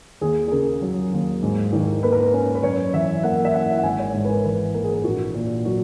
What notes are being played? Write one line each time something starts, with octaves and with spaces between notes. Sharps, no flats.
D#2 G#4
G#4
C#3 A#4
F#3
D#2
G#2
D#3
A#3 B4
A#4
B4
C#4
B4
F#2 C#5
E3 E5
A#3 F#5
E5
E4 F#5
F#5
G#1 G#5
C#5
G#2
B4
A#4
E3 B4
A#3 A#4
G#4
A#4
A#1 F#4
A#2
F#3 F#4